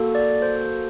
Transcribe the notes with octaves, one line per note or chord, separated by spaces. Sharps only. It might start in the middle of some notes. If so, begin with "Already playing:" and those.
Already playing: A#3 F#4 A4
D5
C5